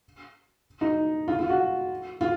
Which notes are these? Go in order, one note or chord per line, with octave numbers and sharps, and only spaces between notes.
D#4
F4
F4
F#4
F4